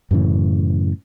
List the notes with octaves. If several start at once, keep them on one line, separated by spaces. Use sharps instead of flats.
F#2 A2 C#3 E3